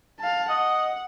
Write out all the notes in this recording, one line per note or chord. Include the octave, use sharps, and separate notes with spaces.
F5 A5
D#5 F#5